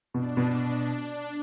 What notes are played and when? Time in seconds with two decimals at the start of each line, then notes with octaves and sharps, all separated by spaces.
0.14 B2 D4
0.37 B2